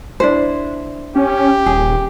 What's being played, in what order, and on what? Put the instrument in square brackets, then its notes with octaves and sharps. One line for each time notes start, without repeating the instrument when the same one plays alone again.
[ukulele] D4 E4 C5
[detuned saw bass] C#4 [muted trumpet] G4
[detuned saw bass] D#1 [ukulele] G#4